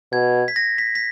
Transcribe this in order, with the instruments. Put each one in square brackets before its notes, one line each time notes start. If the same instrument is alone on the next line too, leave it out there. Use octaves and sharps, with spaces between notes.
[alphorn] B2 [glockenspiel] G#6
[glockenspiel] B6
A#6
B6
B6